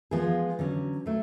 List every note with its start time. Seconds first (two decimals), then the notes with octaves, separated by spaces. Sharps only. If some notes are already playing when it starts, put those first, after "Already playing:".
0.11 F3 G#3 B3 F4 G#4
0.59 D3 F#3 C#4
1.06 F#3 A3